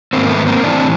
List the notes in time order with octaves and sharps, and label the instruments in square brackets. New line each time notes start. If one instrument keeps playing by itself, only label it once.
[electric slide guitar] G#2 D#3 A#3 C4
A3 B3
A#3 C4
A2 E3 C4 D4